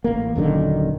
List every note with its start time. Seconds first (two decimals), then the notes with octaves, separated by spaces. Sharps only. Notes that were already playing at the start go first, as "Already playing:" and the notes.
0.04 A1 A#3
0.35 D#1 F#2 D3 D#3